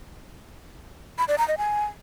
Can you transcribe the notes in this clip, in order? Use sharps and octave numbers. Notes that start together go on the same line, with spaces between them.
B5
D5
A#5
D#5
G#5